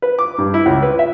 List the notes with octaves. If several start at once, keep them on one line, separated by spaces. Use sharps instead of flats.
B4
D6
G2
E4
C#2
B4
E5